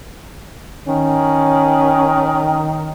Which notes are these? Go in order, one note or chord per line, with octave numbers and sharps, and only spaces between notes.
D#3 C#4